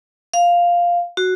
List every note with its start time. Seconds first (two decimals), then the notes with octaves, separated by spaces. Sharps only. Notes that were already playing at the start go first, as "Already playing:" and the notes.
0.34 F5
1.17 F#4